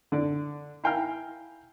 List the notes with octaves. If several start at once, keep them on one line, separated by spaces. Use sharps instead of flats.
D3 D5
E4 F5 G5 G#5 A#5 F6